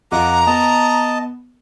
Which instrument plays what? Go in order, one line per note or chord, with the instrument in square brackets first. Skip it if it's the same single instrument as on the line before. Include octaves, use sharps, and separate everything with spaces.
[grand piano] F2 F4 D#5 [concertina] F#5 D6 [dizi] A#5
[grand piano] B3 [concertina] D#5 A5